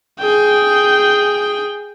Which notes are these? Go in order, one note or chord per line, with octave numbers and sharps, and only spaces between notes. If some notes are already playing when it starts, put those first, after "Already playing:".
G#4 G5